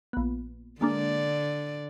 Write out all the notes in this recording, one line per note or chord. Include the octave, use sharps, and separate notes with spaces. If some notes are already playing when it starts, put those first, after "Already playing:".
A#1 B3
D3 G#3 A#3 D4 D5